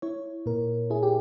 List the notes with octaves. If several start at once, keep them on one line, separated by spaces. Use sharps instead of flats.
E4 C#5
A#2 A#4
E4 G#4
G4